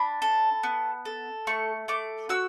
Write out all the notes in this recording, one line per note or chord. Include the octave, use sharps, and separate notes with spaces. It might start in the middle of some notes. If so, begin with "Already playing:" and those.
Already playing: D4 B5
A4
B3
A4
A3 C#6
A3 D6
F#4 E6